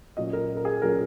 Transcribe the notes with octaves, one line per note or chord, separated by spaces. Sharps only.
A#2 F#3 C#4 D#5
A#4
A#4
G#4
A#2 F#3 C#4 A#4